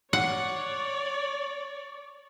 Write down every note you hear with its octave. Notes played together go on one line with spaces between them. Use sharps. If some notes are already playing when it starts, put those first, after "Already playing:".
C#5 D5 F#5